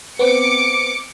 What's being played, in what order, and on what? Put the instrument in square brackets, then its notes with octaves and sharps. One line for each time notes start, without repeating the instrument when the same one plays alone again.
[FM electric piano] B3 C4 [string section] D6 C#7